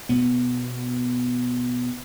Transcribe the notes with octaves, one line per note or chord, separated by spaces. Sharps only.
B2 B3